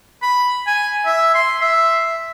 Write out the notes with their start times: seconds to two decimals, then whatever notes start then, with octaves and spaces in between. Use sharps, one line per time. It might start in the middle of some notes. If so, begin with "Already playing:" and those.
0.22 B5
0.67 G#5
1.06 E5
1.34 C6
1.61 E5